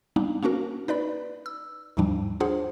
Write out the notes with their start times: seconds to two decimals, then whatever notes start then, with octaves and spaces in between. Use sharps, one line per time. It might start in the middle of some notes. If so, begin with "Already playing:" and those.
0.16 G3 A#3 B3 D4 D#4
0.43 A#3 C#4 D4 F#4 A#4
0.88 D#4 B4 D5 B5
1.46 E6
1.97 D#2 G#2 F3 G3 D4
2.40 D4 F4 G#4 C5 F#5